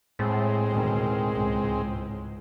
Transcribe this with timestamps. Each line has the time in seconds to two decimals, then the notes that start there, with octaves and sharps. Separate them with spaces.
0.19 A2 G#3 C4
0.69 D2 B2 D#3
1.32 C#2 G#2